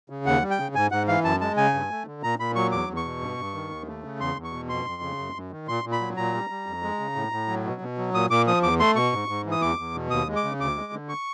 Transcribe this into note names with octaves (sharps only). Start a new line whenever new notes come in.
C#3
D#2 F#5
G3
G5
C#3
G#2 G#5
G#2 F#5
E3 F5
F#2 A5
G#3 A5
C#3 G#5
G2
A3
D3
A#2 A#5
A#2 B5
F#3 C#6
E2 D6
E2
C#6
B2
G2
G2
D#3
D#2
A3
C#3
E2 C6
E2
C#6
B2
F2 C6
F2
C#3
F#2
F#2
D#3
A#2 C6
A#2
B5
F#3
A#2 A#5
G3
G3
F2
G#3
C#3
A2
A2
F#3
B2
B2
F#3
A#2 D#6
A#2 D6
F3 D#6
E2 D6
A3 C6
B2 C#6
G#2
G#2
E3
D#6
E2 D6
E2
B2
D#2 D#6
G#3
D6
C#3
D2 D6
G#3
D3
C#6